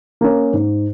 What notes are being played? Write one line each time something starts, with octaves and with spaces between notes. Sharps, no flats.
A#3 C#4
G#2